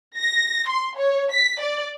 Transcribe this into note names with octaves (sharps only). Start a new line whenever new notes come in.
A#6
C6
C#5
B6
D5